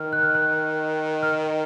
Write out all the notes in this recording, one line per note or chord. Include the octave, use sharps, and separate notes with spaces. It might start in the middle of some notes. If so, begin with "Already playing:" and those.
Already playing: D#3 F6
F#6
F6
F#6
F6